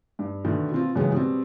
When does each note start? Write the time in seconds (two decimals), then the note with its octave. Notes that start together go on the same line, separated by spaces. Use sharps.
0.19 G2
0.45 B2 D3 D#3 A3
0.72 B2 C4 F4
0.95 C#2 F#2 E3 F#3 G#3 B3
1.12 B2 G3 C4